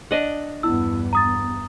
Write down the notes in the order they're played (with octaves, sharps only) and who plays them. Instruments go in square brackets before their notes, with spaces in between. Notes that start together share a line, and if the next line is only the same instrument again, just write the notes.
[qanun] D4 D#5 F#5
[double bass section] E2 G2 B3 [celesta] E4 E6
[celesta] A#5 D#6 A6